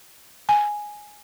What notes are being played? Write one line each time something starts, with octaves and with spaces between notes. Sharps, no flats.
G#5